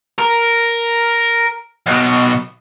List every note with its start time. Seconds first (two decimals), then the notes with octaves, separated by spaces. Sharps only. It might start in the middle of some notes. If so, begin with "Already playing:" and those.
0.18 A#4
1.86 B1 B2